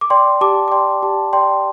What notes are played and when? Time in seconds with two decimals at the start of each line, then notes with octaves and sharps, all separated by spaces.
0.01 D6
0.10 D5 G5 C6
0.41 G4 A5 D6
0.68 D6
0.71 D5 G5 C6
1.03 G4 A5
1.33 D5 G5 C6